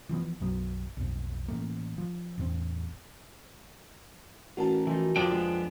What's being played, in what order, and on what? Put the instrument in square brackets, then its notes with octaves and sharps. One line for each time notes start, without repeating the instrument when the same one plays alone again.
[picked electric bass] E3 F3 A3 B3
B1 F#2 F#3 B3
B1 F2
A1 A3 A#3
F3
A1 E2 C4
[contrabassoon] A1 [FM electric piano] F#4 A#4 A5
[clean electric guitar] E3 F3 D#4
[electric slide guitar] F2 D4 G5 [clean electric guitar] D3 D5 [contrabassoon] F3
[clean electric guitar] D3 G#3 B3